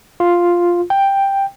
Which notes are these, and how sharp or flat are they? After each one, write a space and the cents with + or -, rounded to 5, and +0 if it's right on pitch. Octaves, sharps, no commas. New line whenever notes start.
F4 +0
G5 +5